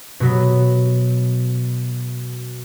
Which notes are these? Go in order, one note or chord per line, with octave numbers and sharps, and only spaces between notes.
B2 F#3 B3